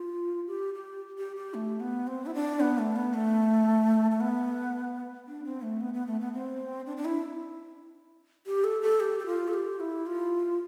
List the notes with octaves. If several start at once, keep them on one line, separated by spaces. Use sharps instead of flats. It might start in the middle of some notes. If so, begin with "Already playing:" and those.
Already playing: F4
G4
G4
G4
G4
A3
B3
C4
E4
D4
B3
A3
B3
A3
A3
B3
D4
C4
A3
B3
B3
A3
B3
C4
D4
D4
E4
G4
A4
A4
G4
G4
F4
A4
G4
E4
F4